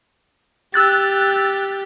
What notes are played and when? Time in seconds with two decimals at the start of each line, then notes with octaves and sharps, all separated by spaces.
0.74 G4 E6 F#6 A6